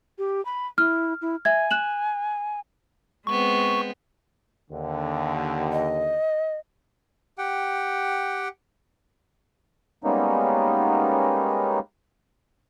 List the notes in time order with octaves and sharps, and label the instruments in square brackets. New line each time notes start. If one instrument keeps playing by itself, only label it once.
[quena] G4
B5
[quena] E4 [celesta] F6
[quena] E4
[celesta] E5 G#6 [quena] G#5
[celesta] F#6 E7 F#7
[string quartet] G#3 B3 C4 [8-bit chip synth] C#6
[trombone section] D#2 D3
[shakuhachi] D#5
[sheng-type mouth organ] G4 F#5 G5
[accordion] G3 G#3 A#3 B3 C#4 D#4